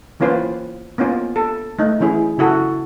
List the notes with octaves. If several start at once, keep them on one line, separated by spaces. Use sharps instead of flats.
E3 A#3 C#4 F4 B4 C5
A#3 B3 C#4 F4
A4
A3 D#4
E3 C#4 E4 G#4
C#3 E4 F#4 A4